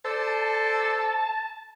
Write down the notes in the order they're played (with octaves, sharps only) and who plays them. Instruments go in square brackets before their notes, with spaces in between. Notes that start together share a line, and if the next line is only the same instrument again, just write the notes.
[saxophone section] A4 C5 D5 [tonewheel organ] A5